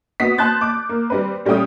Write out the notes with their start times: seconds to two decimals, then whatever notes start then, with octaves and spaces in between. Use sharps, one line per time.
0.20 B3 F#4 D#6 B6
0.38 A5 C6 F#6 G6 A6
0.61 D6
0.89 A#3
1.10 G3 C4 B4
1.45 A#2 G3 A3 C#4 G5 D#6